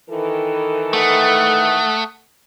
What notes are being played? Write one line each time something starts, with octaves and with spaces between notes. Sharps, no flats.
D#3 E3 A4
A3 F#5 D#6